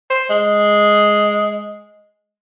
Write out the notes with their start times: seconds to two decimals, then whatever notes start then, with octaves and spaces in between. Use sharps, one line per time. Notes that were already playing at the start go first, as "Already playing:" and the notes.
0.10 C5
0.30 G#3